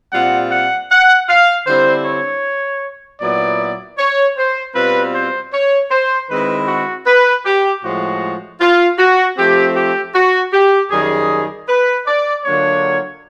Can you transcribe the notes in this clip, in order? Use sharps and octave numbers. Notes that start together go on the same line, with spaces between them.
A#2 G3 C4 F4 F#5
F#5
F#5
F5
D3 G3 C4 E4 C5
C#5
A#2 F#3 B3 E4 D5
C#5
C5
B2 G3 C4 F4 B4
C5
C#5
C5
D#3 G#3 C4 E4 B4
F#4
B4
G4
A2 F3 G#3 F#4
F4
F#4
F3 A3 C4 G4
G4
F#4
G4
F#2 D#3 G3 G#4
B4
D5
D3 F#3 A#3 D4 F4 C#5